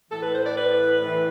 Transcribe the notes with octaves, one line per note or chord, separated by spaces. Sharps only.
A2 E3 A4
B4
C5
D5
B4
A2 E3